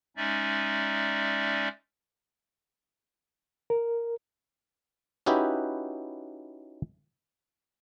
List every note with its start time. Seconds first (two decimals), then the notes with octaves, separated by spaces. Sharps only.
0.17 G#3 C#4 D#4 D5 E5
3.70 A#4
5.26 C#4 D#4 E4 F#4 G4 B4